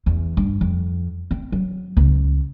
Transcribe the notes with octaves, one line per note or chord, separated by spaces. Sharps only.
E2
G2
F2
C4
F#3
C#2